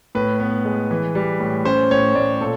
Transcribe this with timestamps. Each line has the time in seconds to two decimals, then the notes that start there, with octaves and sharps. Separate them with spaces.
0.15 A2 B4
0.40 B3
0.65 G#3
0.91 E3
1.15 G3
1.40 A2
1.65 C#4 C5
1.91 A2 C#5
2.15 A2 D5
2.41 A#2 A4